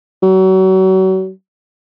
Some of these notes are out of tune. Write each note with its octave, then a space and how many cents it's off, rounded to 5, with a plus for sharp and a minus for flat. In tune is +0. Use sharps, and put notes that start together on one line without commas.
F#3 +35